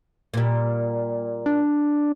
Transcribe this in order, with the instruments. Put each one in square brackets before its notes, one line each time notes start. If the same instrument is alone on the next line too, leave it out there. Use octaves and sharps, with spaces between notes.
[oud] A#2 G3
[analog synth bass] D4